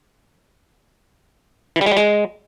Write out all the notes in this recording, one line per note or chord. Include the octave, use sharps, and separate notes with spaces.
E3
G3
G#3
G3
G#3